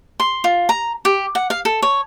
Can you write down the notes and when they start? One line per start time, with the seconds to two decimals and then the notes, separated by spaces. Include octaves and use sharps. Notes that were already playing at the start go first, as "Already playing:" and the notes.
0.20 C6
0.44 F4
0.69 A#5
1.05 G4
1.35 F#5
1.50 F5
1.65 A4
1.82 C#5